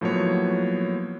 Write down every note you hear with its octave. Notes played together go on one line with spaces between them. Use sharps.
A2 F3 F#3 A#3 B3 C#5